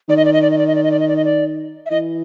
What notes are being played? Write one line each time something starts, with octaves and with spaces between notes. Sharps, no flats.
D#3 D5
D#5
D5
D#5
D5
D#5
D5
D#5
D5
D#5
D5
D#5
D5
D#5
D5
E5
E3 D#5